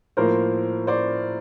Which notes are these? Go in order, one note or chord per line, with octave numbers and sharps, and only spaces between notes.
A2 F3 A#3 A#4 C5
C5 D5